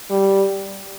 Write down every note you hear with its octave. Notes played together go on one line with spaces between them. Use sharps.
G3